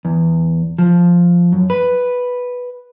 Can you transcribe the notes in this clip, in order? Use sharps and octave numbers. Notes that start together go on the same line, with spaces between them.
E2
F3
F#2
B4